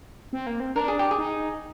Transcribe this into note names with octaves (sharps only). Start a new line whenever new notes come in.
C4
A#3
C4
D4 A#4
G#4
G4
G#4
D#4